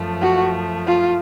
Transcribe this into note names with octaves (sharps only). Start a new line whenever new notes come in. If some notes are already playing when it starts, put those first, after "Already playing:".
Already playing: F#2 F3 A3
F#4
F4